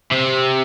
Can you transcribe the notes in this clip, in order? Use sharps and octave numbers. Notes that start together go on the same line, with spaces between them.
C3